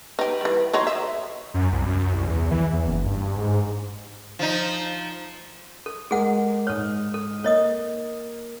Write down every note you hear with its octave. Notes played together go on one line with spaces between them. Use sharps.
D#4 G4 B4
E3 G3
F#3 D#4 C#5 C6
D#5 E5
F#2
C2
F#2
C2
E2
E3
E2
F#1
G2
G#2
F3 D#4
A4
G#3 G#4 A#4 F#5
G#2 A4 C#5 F6
A4
A#3 C#5 D#5 D#6